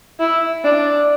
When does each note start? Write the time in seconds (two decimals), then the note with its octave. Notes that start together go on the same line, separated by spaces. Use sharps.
0.19 E4
0.64 D4